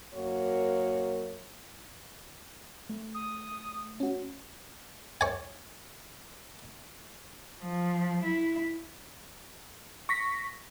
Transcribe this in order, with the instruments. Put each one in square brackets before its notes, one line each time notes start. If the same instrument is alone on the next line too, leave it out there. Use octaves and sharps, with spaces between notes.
[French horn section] F#2 A#3 F#4 C#5
[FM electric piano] A3
[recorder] D#6
[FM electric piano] C#4 F#4
[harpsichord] C#5 G#5
[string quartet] F3
E4
[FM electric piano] C#6 A#6 B6